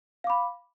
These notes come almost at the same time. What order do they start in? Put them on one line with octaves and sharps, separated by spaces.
F5 D6 B5